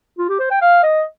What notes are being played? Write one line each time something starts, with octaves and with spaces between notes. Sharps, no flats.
F4
G4
C5
G5
F5
D#5